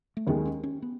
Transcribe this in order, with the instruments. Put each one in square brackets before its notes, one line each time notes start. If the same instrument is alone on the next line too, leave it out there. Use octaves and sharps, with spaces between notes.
[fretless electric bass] A3
[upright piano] D#2 D#3 G#3 [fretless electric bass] B3
[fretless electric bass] C#4
C#4
B3